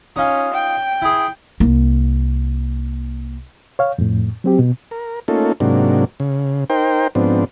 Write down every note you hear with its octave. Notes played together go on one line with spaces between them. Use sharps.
C#4 D#4 F4
G5
E4 G#4
C2 A#3
C#5 F5
F2 A2
F#3 C4 G4
B2
A#4
A3 A#3 C#4 D#4 F4 A4
G#2 C3 F#3 A#3 D4
C#3
D#4 A#4 C5 G5
G#2 F3 B3 C4 D4